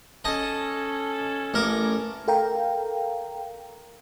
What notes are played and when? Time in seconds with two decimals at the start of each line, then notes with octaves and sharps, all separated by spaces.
0.25 C#4 A4 D#5 A5 D#6
1.54 A1 A#4 D6
2.28 A4 A#4 F5 G5 A#5